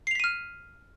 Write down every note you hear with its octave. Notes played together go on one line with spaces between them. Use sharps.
F6 B6 C7 D#7 F7